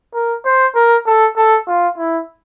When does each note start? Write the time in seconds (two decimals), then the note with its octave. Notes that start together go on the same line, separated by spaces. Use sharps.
0.14 A#4
0.45 C5
0.75 A#4
1.06 A4
1.36 A4
1.67 F4
1.98 E4